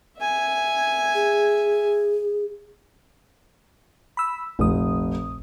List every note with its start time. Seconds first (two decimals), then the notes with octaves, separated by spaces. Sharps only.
0.19 E5 G#5
1.15 G#4
4.17 B5 E6
4.59 F1 A#1 D#6